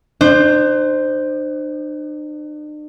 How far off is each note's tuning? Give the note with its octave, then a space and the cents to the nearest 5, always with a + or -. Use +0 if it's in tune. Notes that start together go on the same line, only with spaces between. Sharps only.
D4 +45 C5 +0